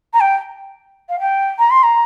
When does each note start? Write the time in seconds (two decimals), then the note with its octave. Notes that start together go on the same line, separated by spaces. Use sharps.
0.14 A#5
0.20 G5
1.09 F5
1.20 G5
1.59 A#5
1.70 C6
1.83 A#5